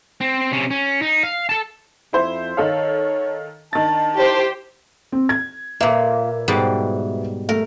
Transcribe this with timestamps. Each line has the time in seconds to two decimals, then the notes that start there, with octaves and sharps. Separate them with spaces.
0.21 C4
0.52 C3 C#4
0.71 C#4
1.02 D#4
1.23 F5
1.49 A4 A5
2.13 F2 E4 C5
2.57 D#3 A4 C#5 F5
3.73 D#3 D4 A5 A6
4.16 E4 G4 C5
5.12 C4
5.29 G#6
5.80 A#2 A#3 A#4 B4 E5
6.48 G#2 B2 G3
7.49 A3 A#4